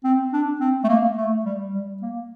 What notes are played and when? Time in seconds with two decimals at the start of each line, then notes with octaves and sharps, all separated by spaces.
0.04 C4
0.33 D4
0.61 C4
0.84 A3
0.88 A#3
1.17 A3
1.45 G3
1.74 G3
2.02 A#3